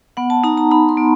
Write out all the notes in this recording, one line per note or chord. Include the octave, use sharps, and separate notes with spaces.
B3 F#5
A5
D#4 A#5
A#5
D#4 B5
C6
B3